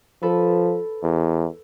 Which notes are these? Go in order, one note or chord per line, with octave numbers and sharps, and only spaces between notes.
F3 A4 B4
E2